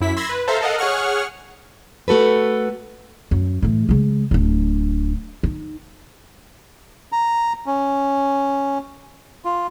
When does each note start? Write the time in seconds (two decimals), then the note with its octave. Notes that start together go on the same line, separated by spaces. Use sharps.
0.01 F#2 E4 B6
0.17 B5 C6 E6 G#6 A#6
0.29 B4
0.47 A4 C5 E5 F5 A#5
0.61 A4 A#4 D#5 F5 F#5
0.78 G#4 C#5 F#5 C#6 F6
2.08 A3 F#4 A4 B4
3.31 F#2
3.62 A2 E3
3.89 C#3 G#3
4.31 D1 D4
5.43 D#4
7.12 A#5
7.66 C#4
9.45 F4